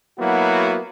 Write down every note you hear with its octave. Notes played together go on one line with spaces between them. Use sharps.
F#3 A#3 B3 E4 F#4